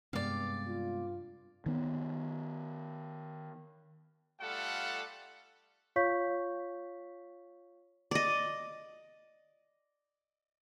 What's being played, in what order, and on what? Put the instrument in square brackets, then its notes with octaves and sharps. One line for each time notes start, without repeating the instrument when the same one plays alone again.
[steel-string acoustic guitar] G2 [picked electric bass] C3 G#3 B3 [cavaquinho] D5 F5
[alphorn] F4
[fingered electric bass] D#3 B3
[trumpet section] G3 A3 F4 A4 F5 F#5
[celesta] F4 C#5 F5 C#6 G6 B6
[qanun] D5 D#5